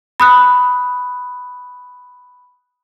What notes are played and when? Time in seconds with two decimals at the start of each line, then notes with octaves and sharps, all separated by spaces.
0.20 B5 D#6 F#6